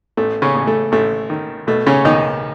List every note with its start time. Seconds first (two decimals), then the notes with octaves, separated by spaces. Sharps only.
0.17 A1 A3
0.42 C#3 C#4
0.55 A1
0.67 A3
0.92 A1 A3
1.30 D#3
1.67 B2 A3
1.87 C#3 C#4
2.05 B1 D#3 D#4